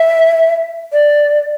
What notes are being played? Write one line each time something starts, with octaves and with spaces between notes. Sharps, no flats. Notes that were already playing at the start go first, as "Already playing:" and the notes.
Already playing: E5
D5